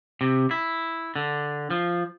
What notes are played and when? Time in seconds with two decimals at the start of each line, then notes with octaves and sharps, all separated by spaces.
0.21 C3
0.51 E4
1.16 D3
1.70 F3